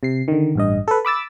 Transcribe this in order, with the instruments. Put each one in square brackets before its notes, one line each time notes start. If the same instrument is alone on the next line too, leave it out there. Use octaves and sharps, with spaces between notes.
[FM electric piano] C3 C7
D3 D#3
A1 G2 D#5
A4 B4
B5 D6 E6 A6